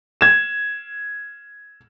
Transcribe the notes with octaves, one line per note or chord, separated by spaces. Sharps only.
G#6 E7